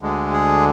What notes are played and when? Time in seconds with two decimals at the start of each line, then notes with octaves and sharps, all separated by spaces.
0.01 D2 D3 G#3
0.33 G#4